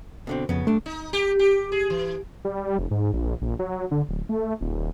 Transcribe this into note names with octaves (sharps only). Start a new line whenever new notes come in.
B2 D3 C4
F2 C#3 B3
G2 A3 D4
D#4
G4
G4
G#4
E3
G3
F1
G#2
A#1
A#1
F#3
D3
D1
A3
D#1